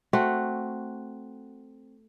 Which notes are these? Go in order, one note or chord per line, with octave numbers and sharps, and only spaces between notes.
A3 C4 F#4